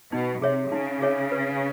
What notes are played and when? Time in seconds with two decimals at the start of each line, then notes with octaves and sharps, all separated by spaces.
0.12 B2 D#4
0.42 C3 G#4 C#5 E5
0.71 C#3 D#4
1.02 G#4 C#5 E5
1.32 B4